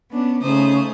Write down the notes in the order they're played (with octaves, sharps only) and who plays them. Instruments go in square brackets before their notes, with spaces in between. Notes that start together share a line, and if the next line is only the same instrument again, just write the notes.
[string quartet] B3 C#4 D4
[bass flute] C#3 [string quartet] A3 D#4 G#4 [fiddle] C5 D#6